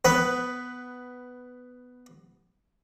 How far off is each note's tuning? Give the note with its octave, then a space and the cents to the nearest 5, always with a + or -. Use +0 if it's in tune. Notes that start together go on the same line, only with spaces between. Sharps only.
B3 +10 B4 +0